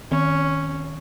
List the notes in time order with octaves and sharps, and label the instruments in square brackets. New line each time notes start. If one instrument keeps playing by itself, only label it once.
[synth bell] D#3 [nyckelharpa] C#4